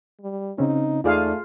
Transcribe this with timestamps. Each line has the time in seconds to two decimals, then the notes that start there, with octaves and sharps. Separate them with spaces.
0.21 G3
0.58 C#3 C4 C#4 D#4
1.04 E2 A3 D#4 F4 G#4 D5 F5